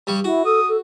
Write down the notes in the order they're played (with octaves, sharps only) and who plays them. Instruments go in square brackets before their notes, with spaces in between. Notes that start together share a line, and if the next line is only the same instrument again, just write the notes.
[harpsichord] G2 G3 C#6
[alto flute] E4 [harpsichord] F#4
[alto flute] A4 [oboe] D#6
[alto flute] A4